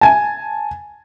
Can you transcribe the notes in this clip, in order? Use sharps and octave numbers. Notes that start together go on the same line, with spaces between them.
G#5 A5